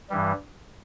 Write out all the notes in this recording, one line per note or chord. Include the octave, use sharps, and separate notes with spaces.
G2 E3 G3